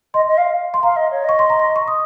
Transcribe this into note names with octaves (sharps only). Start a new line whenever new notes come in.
D#5 C6
D#5
F5
C6
F5 A#5
D#5
C#5
D#5 C#6
C6
A#5
C6
C#6
D#6